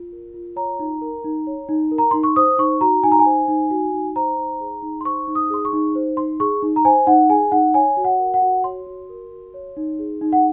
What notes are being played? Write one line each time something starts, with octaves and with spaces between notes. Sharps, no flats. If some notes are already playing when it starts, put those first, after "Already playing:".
Already playing: F4
A#4
F4
C#5 A#5
D#4
A#4
D#4
C#5
D#4
A#4
A#5
D#4 C6
C#6
C5 D#6
D#4 C#6
F#4 A#5
D#4 G#5
A#5
G#5
C5
D#4
F#4
D#4
C5 A#5
D#4
G#4
D#4
C6
C5 C#6
D#4
D#6
G#4 C6
C#6
D#4
C5
D#4 C6
G#4 C#6
D#4
A#5
C5 G#5
D#4 F#5
G#4 G#5
D#4 F#5
C#5 G#5
F#4
F#5
A#4
F#5
F#4
C#5 C6
F#4
A#4
F#4
C#5
D#4
G#4
D#4
F#5